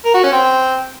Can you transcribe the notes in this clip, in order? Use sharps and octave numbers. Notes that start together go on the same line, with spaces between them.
A#4
F#4
C#4
C4